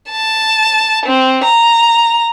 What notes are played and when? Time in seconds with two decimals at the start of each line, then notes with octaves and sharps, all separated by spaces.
0.11 A5
1.06 C4
1.45 A#5